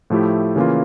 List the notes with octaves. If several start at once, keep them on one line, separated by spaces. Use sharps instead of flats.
A2 F3 A3 E4 G4
C#3 E3 A#3 C#4 F4